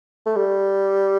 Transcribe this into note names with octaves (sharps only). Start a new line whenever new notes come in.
A3
G3